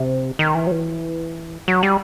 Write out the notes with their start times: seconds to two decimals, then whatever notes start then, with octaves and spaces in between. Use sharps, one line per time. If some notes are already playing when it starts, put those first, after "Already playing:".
Already playing: C3
0.39 D#3
0.55 E3
0.67 F#3
0.71 E3
1.68 F#3
1.83 G3